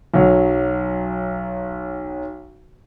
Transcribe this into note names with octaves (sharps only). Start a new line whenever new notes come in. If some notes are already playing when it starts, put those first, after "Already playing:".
B1 F#3